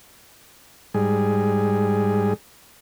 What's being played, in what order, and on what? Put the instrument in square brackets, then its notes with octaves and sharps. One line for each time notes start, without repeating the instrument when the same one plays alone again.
[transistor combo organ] G#2 G3 G#4